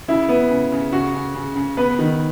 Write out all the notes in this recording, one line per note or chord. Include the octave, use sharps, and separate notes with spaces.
C#3 E4
B3
C#3
C#3
C#3 F#4
C#3
C#3
C#3
B3 B4
D#3